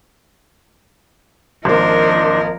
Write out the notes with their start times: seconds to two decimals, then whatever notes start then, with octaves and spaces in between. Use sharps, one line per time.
1.65 G#1 F3 A#3 D4 A#4 C5 D#5